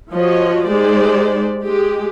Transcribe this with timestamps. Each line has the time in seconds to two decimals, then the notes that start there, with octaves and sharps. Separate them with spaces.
0.14 F3 F#4 C#5 D#5
0.69 G#3 D#4 G4 C5 D5
1.64 G#3 G4